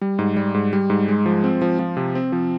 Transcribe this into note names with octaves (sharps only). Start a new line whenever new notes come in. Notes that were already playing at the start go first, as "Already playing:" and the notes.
G3
G#2
G3
G#2
G3
G#2
G#3
F3
C4
F3
F3
C3
C4
F3